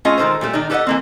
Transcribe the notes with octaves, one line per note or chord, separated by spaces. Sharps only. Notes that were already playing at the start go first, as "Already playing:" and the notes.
A3 C#4 F4 G#4 D#5
D#3 G#3 D#4 A4 A#4 C5
A#2 G3 A3 G4
D#3 D4 D#4 D5
G4 A4 B4 C#5 D#5 F#5
E3 A#3 C4